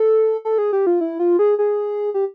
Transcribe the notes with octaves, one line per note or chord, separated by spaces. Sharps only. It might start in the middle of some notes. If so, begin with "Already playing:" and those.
Already playing: A4
A4
G#4
G4
F4
E4
F4
G#4
G#4
G4